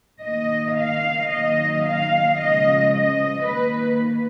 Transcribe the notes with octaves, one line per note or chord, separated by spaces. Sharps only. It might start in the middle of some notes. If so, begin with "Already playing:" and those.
D#3 A#3 D#5
F5
D#3 F#3 A#3 D#5
F5
C#3 F3 G#3 D#5
D#5
D#3 A#3 B4